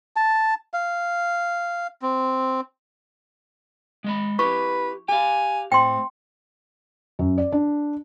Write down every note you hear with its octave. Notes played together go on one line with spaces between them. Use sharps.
A5
F5
C4
G#3 D#5 B5
E4 G4 B4 C#6
G4 F5 G#5
A2 C4 G5 C6
F#2
D5
D4